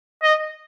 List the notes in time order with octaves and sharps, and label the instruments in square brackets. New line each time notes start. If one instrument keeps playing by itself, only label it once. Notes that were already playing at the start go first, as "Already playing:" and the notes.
[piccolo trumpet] D#5